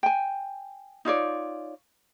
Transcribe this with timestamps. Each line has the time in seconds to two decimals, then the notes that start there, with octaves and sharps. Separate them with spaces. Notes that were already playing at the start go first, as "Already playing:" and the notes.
0.03 G5 G#5
1.05 D#4 F4 C#5 D5